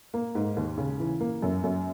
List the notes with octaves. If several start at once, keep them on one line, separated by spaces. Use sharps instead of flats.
A#3
G#2
D#2
C#3
E3
A#3
F#2
F#2